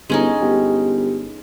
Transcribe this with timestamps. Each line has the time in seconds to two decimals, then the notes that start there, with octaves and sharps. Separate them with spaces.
0.10 G1 G#3 C#4 D#4
0.42 G1 G4